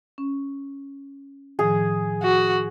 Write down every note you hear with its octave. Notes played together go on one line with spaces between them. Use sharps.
C#4
A2 D#3 F3 G#4
F#4